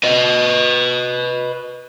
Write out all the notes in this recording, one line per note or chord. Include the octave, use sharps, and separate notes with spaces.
B4 D#5